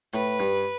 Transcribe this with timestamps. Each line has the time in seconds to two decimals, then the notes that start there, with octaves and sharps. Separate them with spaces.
0.14 A2 B4
0.40 G2